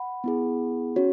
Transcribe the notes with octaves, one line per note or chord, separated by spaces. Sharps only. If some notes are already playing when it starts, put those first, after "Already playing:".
Already playing: F#5 B5
B3 E4 G#4
C#4 F#4 C#5